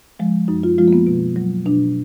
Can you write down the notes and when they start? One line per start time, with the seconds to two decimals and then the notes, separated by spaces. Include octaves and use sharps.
0.19 F3 G#3
0.48 F#2 D#4
0.63 F4
0.78 F3 G#3 F4
0.88 A#3
0.93 B3
1.07 B2
1.36 F#3
1.65 B2 D4